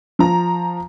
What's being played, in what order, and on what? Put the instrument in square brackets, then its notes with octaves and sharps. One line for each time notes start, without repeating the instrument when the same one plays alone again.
[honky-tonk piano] F3 A#5